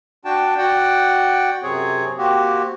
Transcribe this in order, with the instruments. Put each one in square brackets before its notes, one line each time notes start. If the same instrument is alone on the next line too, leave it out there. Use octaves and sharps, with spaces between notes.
[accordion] D4 F#4 G5 A5
F#4 D5 F#5 G5
F#2 C3 C4 G#4 C#5
A#3 C4 F#4 G4